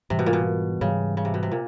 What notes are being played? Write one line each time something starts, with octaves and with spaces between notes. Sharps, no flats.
G#2 C3 E3 G3
B2
A#2
B2
G#2 C#3 E3 G3
C#3
C3
B2
C3
A#2